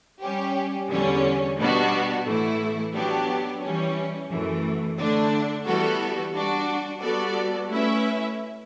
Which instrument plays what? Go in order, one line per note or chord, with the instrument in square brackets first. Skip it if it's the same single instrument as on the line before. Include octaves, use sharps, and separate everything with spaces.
[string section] G3 C#4 G4
E2 D3 G3 C#4
B2 G3 B3 D4 F#4
A2 E3 A3 E4
F#3 B3 D4 G4
E3 G3 C#4
F#2 E3 A3
D3 A3 D4
E3 G3 B3 F#4 A4
G3 D4 F#4
G3 B3 F#4 A4 D5
A3 C#4 E4 B4 E5